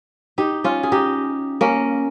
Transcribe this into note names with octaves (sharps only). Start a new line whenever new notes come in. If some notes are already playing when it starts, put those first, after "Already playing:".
D#4 G4
C#4 F4
G#4
D#4 G4
A#3 C#4